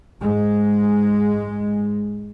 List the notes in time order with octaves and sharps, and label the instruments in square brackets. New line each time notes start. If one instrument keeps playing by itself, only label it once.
[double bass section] G#2 G#3